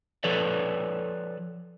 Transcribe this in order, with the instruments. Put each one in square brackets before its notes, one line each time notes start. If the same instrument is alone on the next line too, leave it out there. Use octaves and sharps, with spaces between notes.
[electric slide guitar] F3 A4 B4 C#5 D5